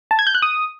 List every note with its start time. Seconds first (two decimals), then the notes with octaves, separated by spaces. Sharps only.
0.11 A5
0.19 G#6
0.27 G6
0.35 F#6
0.42 D#6